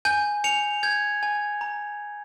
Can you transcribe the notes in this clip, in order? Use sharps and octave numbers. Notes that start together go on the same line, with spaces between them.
G#5 G6
G#5 C#7 F7
G6 G#6
G#5
A#5